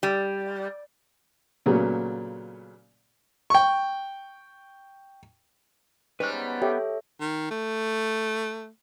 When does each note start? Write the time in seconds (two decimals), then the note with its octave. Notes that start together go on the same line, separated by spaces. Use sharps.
0.03 G3
1.66 A#2 C#3 F#3 A3 B3
3.50 G5 C#6
6.20 G#2 G3 C#4 B4 F#6
6.33 B3
6.62 G4 A4 C#5 E5
7.20 D#3
7.51 A3